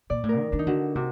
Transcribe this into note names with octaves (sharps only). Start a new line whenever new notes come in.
A#2 D5
A2
A#4
D#3
D#3 D4
D#4
D3 F#4
C3 F#4